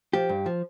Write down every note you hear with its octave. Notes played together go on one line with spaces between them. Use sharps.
F3 G4
G2
F3